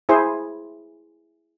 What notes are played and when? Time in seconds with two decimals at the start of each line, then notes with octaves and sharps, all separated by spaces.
0.09 E4 G#4 C5